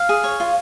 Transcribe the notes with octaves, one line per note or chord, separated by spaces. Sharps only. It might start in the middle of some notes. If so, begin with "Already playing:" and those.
Already playing: F5
G#4
C#5
F4